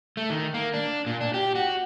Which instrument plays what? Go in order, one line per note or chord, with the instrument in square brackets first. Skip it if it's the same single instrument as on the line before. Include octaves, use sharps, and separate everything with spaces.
[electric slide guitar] A3
D#3
A#3
D4
A#2
D4
G4
F#4